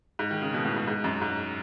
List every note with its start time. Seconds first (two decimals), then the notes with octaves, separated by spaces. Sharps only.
0.19 G#2
0.31 D#3
0.42 C#3
0.53 B2
0.65 A2
0.76 G#2
0.87 G#2
1.04 F#2
1.21 G#2